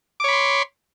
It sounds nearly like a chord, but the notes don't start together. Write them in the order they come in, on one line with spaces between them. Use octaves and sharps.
D6 C#5 B5 C6